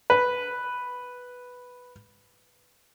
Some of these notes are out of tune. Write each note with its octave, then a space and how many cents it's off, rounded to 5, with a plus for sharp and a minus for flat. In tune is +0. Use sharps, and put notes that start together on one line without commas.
B4 +0